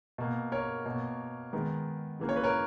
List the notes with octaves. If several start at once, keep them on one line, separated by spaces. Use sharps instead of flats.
B2 A#3
A#4 C#5
B2 A#3
D#3 G#3 B3
C#3 E3 A#3
C#5
B4
A#4 C#5